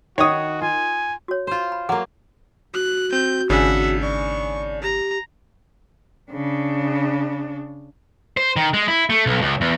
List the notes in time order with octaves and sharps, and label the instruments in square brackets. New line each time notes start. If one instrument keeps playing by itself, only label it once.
[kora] D#3 [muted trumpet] F#4 [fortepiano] C#5 D#6
[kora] F4 [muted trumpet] G#5
[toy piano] F#4 C#5
[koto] F4 C5
[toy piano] B5
[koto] F#3 A#3 [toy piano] G#4 F#5
[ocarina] F#4 [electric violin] F#6
[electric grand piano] C4 [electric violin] G6
[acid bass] G#1 [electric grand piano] C#3 D4 G#5 [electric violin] E5 F#5
[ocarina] D5 [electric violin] C#6
[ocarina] G4 [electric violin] A#5
[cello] C#3 D4
[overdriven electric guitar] C5
D#3
G#3
E4
A3
B1
C#2
E2